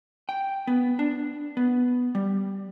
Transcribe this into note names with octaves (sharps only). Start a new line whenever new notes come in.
G5
B3
D4
B3
G3